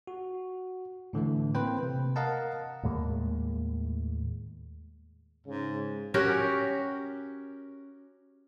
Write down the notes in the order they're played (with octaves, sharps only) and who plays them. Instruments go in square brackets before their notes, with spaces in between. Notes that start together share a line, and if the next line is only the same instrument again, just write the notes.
[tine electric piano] F#4
A2 D3 E3 A3
A#3 C4 B4 C5 G5
C3
A#4 D#5 F5 F#5 A5
[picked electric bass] D#2 A2 G#3 A#3
[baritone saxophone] G#2 [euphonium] C#3
[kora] C#4 F#4 G4 A#4